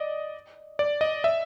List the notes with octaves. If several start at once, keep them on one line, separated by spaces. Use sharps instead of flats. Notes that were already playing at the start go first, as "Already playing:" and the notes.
Already playing: D5 D#5
D5
D#5
E5